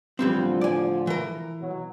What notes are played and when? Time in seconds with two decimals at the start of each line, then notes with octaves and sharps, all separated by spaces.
0.19 A2 D3 E3 F3 G3 C4
0.61 D5 G#5
1.07 E3 A#4
1.60 B2 F#3